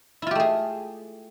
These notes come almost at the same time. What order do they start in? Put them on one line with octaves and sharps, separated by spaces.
E4 F4 G4 A3 G#4